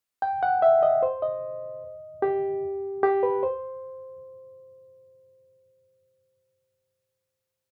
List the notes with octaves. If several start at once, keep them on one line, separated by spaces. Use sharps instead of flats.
G5
F#5
E5
D#5
C5
D#5
G4
G4
B4
C5